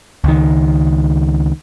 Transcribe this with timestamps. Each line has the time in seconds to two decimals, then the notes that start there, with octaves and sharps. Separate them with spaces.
0.24 C#2 D#3